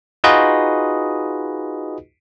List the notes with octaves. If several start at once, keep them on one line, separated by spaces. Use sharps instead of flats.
D#4 F4 F#4 G#4 B4 D#5